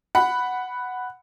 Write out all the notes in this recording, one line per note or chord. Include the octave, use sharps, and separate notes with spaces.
F#5 B5